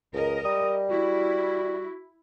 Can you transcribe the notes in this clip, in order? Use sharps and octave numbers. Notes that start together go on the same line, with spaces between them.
C#2 A#4 D#5
G3 D#6
E4 F#4